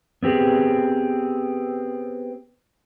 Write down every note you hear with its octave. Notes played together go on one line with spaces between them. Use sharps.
B3 C4 G4 G#4